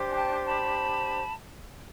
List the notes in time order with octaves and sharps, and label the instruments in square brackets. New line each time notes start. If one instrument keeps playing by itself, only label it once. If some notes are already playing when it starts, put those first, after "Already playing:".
Already playing: [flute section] D4 G4 C5
G#5
G5 A5
A5 B5